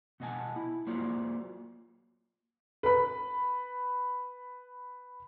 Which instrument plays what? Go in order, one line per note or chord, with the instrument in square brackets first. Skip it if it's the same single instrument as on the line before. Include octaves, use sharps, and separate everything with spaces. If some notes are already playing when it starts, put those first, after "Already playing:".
[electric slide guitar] B2 B3 D#5 F#5 G#5 A5
E4
F#3 A#3 F4 F#4 C5 D5
[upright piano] B4 B5